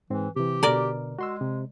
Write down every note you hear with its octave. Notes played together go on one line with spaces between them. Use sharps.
G#2 E3 C4
C3 E3 G4
B2 D3 A#4 D5
G#3 F#4 C6 E6
C3